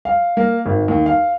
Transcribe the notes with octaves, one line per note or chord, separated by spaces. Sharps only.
F5
A#3
G#1
D#2
F5